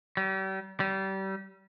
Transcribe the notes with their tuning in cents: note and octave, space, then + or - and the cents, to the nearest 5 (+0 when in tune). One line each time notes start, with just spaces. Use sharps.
G3 -40
G3 -30